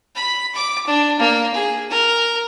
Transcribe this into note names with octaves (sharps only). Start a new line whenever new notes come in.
B5
D6
D4
A#3
G#4
A#4